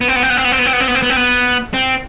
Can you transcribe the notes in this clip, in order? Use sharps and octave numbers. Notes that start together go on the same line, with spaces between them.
B3
C4
B3
C4
B3
C4
B3
C4
B3
C4
B3
C4
B3
C4
B3
C4
B3
C4